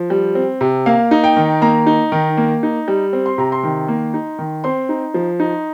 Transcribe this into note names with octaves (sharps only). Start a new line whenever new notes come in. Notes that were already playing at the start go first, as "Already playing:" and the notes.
Already playing: F3
G3
C4
C3
A#3 F5
D#4
G5
D#3
A#3 A#5
D#4
D#3
A#3
D#4
G3
C4
C6
C3 A#5
C6
D#3
A#3
D#4
D#3
C4 C6
D#4
F3
D#4